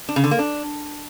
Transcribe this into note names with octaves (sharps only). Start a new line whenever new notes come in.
D4
C#3
D3
A#3
D4